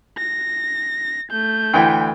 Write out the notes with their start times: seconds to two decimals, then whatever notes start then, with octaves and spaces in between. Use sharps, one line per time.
0.18 A#6
1.31 A3 G6
1.73 D2 E3 G5